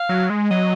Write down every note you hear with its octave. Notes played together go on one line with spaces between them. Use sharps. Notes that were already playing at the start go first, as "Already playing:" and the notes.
Already playing: F5
F#3
G#3
F#3 D#5